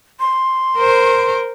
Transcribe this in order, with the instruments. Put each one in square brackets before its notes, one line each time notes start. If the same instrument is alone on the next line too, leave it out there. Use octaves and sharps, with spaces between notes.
[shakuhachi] C6
[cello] A#4 C5